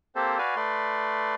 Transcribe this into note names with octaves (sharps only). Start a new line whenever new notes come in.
A#3 C4 G4 A4 C5
F#4 B4 D5 F5 G#5
A3 B4 D5 C6